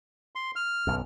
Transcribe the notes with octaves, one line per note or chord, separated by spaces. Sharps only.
C6
F6
B1 F#2